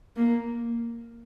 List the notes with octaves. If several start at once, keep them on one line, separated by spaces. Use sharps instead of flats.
A#3